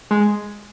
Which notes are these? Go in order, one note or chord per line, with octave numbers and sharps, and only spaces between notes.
G#3